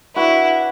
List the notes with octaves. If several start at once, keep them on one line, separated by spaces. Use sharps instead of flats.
D4 E4 F#4 B4 E5